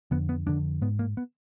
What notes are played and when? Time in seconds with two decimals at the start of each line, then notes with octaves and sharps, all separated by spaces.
0.11 F2 D3 B3
0.29 B3
0.46 F2 D3 D4
0.82 G#2 B3
0.99 A#3
1.17 B3